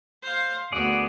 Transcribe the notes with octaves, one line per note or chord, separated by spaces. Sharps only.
C5 F5
D2 B3 F#4 G#4 D5